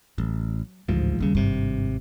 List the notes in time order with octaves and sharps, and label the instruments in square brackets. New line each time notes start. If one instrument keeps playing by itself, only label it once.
[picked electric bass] A1 [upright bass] F#3
[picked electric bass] A1 G#2 F3 [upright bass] D2
[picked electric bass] D#2 C#3 [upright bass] G3 B3
[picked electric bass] G#1 C3 [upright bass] G2